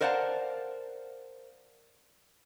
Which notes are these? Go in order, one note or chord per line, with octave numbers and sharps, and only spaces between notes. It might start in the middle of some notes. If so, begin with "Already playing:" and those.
A#4 C5 D5 F5 F#5 A5